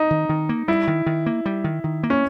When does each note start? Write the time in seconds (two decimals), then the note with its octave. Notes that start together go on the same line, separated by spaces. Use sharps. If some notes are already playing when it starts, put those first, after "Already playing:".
Already playing: D#4
0.11 D#3
0.29 D#3
0.49 A#3
0.68 G3 E4
0.88 D#3
1.06 D#3
1.26 A#3
1.46 G3
1.64 D#3
1.84 D#3
2.03 A#3
2.10 C#4